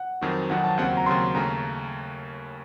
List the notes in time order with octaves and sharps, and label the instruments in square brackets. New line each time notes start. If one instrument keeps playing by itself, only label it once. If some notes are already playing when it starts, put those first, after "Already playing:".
Already playing: [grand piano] F#5
[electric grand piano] F2 D#3 F#3 C4 F#4
[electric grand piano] F2 D#3 F#3 C4 F#4 [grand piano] F#5
[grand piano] A5
[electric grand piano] D#2 C#3 F#3 C4 [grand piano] F#5
[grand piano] A#5
[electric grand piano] D#2 C#3 F#3 C4 [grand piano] C6
[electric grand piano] D#2 C#3 A3 C#4 [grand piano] A#5